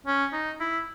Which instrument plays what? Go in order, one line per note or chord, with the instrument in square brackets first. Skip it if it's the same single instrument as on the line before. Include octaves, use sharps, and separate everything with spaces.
[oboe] C#4
D#4
E4